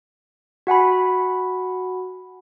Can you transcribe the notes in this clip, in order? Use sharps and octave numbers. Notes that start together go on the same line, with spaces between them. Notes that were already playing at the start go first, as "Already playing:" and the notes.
F#4 F#5 G#5 B5